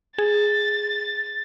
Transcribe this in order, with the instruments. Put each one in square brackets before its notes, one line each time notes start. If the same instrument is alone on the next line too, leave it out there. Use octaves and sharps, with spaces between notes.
[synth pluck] G#4 [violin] A6